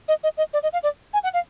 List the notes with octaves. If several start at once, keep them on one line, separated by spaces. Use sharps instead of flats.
D#5
D#5
D#5
D5
D#5
F5
D5
G#5
F#5
F5